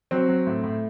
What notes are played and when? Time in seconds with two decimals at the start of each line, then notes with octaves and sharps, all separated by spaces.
0.11 F#3 C4
0.28 F#3
0.47 A2
0.63 A2